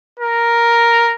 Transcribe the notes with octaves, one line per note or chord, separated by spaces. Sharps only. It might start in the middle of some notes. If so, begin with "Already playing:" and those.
A#4